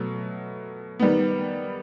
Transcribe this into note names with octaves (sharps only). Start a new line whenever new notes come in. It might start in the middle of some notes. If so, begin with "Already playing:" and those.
Already playing: B2 F#3 A3
D#3 G3 B3